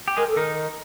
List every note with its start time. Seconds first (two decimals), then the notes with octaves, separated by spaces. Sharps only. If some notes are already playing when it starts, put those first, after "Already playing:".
0.08 G4
0.17 G#3 G#4 A#4
0.28 A4
0.36 D#3 D#4 A#4